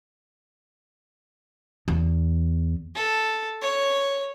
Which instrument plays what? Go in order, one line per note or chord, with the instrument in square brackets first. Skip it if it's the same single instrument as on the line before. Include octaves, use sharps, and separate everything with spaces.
[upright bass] E2
[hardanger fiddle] A4
C#5